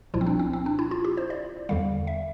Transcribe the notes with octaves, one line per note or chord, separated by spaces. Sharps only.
C2 A#2 F3 E4
C4
D4
C4
C4
D4
E4
F4
G4
C5
D5
E2 D3 G3 F5
E5